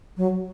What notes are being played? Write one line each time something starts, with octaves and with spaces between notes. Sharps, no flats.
F#3